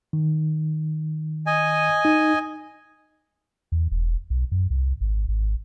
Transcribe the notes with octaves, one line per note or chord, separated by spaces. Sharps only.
D#3
D#5 G#5
D#4
E2
E1
B1
F#2
C2
G#1
G#1